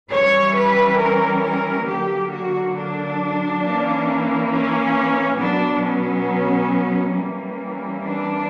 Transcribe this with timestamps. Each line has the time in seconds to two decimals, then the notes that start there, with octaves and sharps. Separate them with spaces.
0.10 E3 G3 C#4 C#5
0.55 B4
0.99 A#4
1.43 A#4
1.86 D3 F#3 A#3 G4
2.32 F#4
2.76 D4
3.63 E3 A#3 C#4
4.51 C#4
5.40 B2 F#3 B3 D4
5.84 C#4
7.16 E3 G3 A#3 C#4
8.04 D4